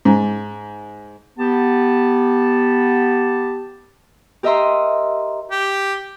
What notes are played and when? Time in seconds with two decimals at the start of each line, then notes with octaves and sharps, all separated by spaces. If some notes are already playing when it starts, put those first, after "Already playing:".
0.05 G#2
1.38 B3 G4 A5
4.43 G4 A#4 D#5 E5 A#5 C6
5.51 G4